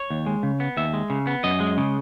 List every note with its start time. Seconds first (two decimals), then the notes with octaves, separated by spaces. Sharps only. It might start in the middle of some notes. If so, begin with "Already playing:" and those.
Already playing: C#5
0.10 D#2
0.26 G#3
0.43 C#3
0.60 B3
0.77 D#2 E5
0.94 G#3
1.10 C#3
1.27 B3
1.44 F#2 D#5
1.60 G#3
1.77 C#3